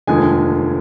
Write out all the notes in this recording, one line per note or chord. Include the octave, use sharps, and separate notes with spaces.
F1 D#2 D3 F3 G#3 G#5